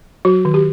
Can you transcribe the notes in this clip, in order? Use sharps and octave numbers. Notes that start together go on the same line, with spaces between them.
F#3 F#4
D#3
G4